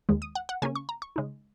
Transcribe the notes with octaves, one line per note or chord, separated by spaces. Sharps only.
D#2 D#3 G#3
D#6
F#5
F#5
C#3 A#3 C#4 G#5
C#6
A#5
C#6
C#3 G#3 D#4